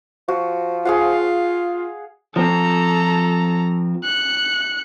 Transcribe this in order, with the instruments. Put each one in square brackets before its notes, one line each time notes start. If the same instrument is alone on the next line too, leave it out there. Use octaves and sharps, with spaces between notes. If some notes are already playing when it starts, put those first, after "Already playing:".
[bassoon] F3 [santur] F#4
[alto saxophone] F4 [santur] G#4 F5 F#5
[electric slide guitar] F3 C4 [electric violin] A4 A#5
[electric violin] F#6 C#7